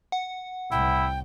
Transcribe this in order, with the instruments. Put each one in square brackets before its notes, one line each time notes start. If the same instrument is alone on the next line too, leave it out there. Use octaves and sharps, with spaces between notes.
[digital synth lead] F#5
[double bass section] C2 A2 [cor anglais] E4 [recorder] G5